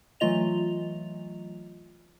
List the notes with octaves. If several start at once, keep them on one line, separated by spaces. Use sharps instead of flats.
E3 F#3 A3 F4 D#5 F7